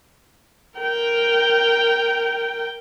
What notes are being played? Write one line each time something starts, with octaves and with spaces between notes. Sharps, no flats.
A#4 G5